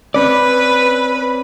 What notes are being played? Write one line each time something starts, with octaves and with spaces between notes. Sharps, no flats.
C4 C#4 B4 D5